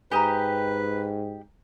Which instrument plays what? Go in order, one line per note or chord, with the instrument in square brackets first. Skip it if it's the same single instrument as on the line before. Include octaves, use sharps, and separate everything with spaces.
[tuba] G#2 [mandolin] G4 D#5 [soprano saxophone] B4 [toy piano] G#5 A#5